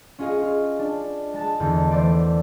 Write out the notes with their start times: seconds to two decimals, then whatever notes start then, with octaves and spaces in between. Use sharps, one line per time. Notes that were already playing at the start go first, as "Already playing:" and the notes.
0.19 C#4 F4 G#4 D#5 F5
0.42 F4 F6
0.79 D4
1.34 G#3 A5
1.60 E2 D3 D#4
1.91 E3 A3 C5 D5 D6